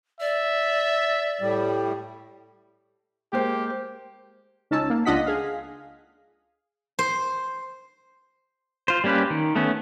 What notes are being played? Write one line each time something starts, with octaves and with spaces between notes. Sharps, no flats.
D5 E5
A2 G3
G#3 A#3 G4 C5
C#2 C#4 D#4 A5 E6
A#3
C#2 D4 F4 D#5 F#5 B6
G#4 F5
C5
F4 C5
G3 A#3 C#4 G4 B4
D#3
A3 B3 C#4